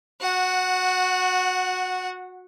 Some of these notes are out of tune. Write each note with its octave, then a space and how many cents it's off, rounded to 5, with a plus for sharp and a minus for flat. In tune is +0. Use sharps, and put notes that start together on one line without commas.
F#4 -20 F#5 +0